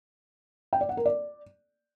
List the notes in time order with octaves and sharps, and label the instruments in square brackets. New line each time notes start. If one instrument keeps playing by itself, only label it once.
[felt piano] G5
D5
F#5
A#4
D5